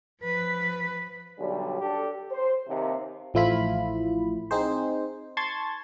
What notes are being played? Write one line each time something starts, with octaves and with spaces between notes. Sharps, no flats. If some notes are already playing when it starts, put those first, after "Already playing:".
F3 B4
B1 D3 F#3 G3
D4 G4 A4
C5
D#2 C3
A1 F3 A3 E4 F4 B5
C4 D#4 G#4 C5
A5 C6 C#6 G#6 A6